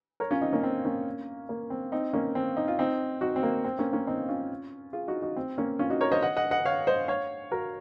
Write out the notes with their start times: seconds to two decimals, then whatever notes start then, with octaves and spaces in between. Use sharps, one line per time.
0.20 A#4 C#5
0.31 C#4 F4
0.41 C4 D#4
0.53 A#3 C#4
0.63 C4
0.85 A#3 C#4
1.49 A#3
1.70 C4
1.92 C4 D#4
2.13 A#3 C#4
2.35 C4
2.57 D#4
2.68 F4
2.79 C4 D#4
3.21 D#4 F#4
3.36 C4
3.43 A#3
3.64 C4
3.79 A#3 C#4
3.93 A#3 C#4
4.07 C4 D#4
4.29 C#4 F4
4.93 F4 G#4
5.08 D#4 F#4
5.22 D#4 F#4
5.36 C4
5.58 A#3 C#4
5.79 C#4 F4
5.90 D#4 F#4
6.01 A#4 C#5
6.12 C5 D#5
6.22 D#5 F#5
6.36 D#5 F#5
6.51 D#5 F#5
6.66 C#5 F5
6.87 C5 D#5
7.08 C#5 F5
7.51 F#4 A#4